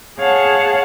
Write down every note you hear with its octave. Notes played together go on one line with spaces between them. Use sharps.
G#4 C#5 F5 F#5 A5